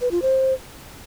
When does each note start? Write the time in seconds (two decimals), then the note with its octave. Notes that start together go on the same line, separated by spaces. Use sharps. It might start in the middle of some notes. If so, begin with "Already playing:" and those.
0.01 B4
0.11 F4
0.22 C5